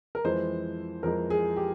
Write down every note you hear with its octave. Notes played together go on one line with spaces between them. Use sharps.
A#4
F2 E3 G#3 C5
F2 E3 G#3 A#4
G#4
G4